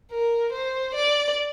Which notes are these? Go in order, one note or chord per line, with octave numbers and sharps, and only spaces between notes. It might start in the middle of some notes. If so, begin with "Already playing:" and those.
A#4
C5
D5